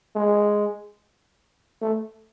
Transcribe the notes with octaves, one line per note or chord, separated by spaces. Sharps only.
G#3
A3